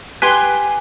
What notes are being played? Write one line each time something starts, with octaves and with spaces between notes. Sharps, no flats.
G4 B4 G#5 C6